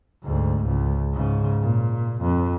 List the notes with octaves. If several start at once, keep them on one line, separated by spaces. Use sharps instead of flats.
D2 G#2
C#2
G#2 C#3
A#2
F2